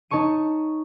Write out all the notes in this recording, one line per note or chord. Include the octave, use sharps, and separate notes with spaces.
D#4 C#5 A5 C#6 D#7